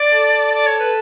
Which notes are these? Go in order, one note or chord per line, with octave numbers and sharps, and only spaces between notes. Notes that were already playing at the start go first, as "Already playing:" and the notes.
Already playing: D5
A4
D5
C#5
B4